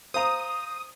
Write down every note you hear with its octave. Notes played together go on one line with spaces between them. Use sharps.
C5 F5 A#5 D#6